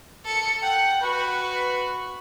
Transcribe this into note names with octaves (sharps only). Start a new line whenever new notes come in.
A4 C#7
F#5 G5
F#4 B4